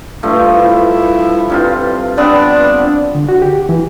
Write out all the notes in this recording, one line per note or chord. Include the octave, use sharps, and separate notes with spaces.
G2 F3 A3
E4
G2 C3 F4
B3 C4 D4
D3
F#4
G4
E3